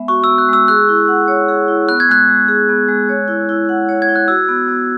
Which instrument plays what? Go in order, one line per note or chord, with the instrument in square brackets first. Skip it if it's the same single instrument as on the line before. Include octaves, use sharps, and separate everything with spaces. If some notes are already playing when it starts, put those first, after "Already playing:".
Already playing: [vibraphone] G#3 B3 E5
[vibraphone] F#4 [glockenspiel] C#6
[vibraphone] B3 [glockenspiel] E6
[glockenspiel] F#6
[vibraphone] G#3 [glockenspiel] E6
[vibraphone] G#4 [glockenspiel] F#6
[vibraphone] E4
F#5
C#5
G#4
E4
[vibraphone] B3 [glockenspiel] F#6
[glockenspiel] G#6
[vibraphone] G#3 [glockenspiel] F#6
[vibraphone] G#3
G#4
B3
G#3
C#5
E4
E4
F#5
C#5
[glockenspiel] G#6
[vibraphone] E4
[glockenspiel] F#6
[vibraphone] F#4 [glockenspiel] E6
[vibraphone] B3
B3